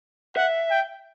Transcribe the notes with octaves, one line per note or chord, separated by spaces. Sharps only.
E5 F#5
G5